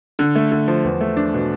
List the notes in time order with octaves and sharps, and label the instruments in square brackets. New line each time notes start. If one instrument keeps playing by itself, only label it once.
[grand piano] D3
A3
D3
F3
E2
A3
D4
B2